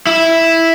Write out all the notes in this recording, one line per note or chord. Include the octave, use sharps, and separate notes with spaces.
E4